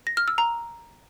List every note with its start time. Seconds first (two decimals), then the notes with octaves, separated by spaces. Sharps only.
0.07 A#6
0.17 F6
0.28 E6
0.38 A#5